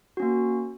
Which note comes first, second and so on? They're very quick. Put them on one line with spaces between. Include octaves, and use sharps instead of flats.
F#4 C#4 A#3